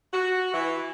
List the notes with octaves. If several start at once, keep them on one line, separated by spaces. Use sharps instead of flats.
F#4
E3